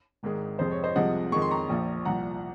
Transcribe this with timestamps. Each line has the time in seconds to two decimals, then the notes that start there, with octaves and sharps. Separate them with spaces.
0.23 G#1 G#2 D#3 G#3
0.59 F2 C3 F3 G#3 C5
0.72 C#5
0.84 C5 D#5
0.96 C2 C3 F3 G#3 D#5 F#5
1.32 F2 D#3 G#3 C#6
1.42 C6
1.51 A#5 C#6
1.69 A#1 A#2 F3
2.05 C2 A#2 F3 F#5 A#5